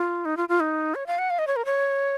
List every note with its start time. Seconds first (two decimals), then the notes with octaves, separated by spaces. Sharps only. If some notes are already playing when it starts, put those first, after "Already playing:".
Already playing: F4
0.25 D#4
0.37 F4
0.49 F4
0.60 D#4
0.95 C#5
1.07 F5
1.18 F#5
1.30 F5
1.39 D#5
1.47 C#5
1.56 A#4
1.65 C#5